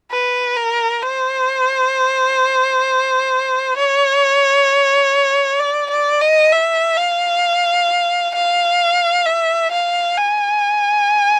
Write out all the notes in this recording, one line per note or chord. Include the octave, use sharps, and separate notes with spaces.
B4
A#4
C5
C#5
D5
D5
D#5
E5
F5
F5
E5
F5
G#5